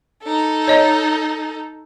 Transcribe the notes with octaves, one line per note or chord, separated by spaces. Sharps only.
D#4 A4
C#5 D#5 A#5